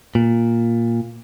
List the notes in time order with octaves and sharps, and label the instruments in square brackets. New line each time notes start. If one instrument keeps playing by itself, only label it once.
[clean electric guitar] A#2